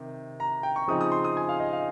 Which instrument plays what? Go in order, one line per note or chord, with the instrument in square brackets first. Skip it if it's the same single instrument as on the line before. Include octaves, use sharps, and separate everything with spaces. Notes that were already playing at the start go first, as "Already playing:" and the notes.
Already playing: [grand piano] C3 D#3
A#5
G5
C#6
C#3 F3 C4 D#4 D#6
D#6
C6
D#6
G#5
F5
D#5
F5